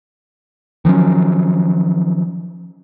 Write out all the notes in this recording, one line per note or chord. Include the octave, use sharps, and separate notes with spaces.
D#3 F3 F#3 C#4